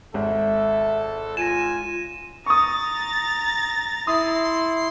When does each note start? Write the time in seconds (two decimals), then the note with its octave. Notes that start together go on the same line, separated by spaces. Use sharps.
0.14 G#1 A4 E5
1.37 F4 G#5 A#6 D#7 E7
2.46 A#5 C#6 D#6 A6
4.07 E4 C6 D#6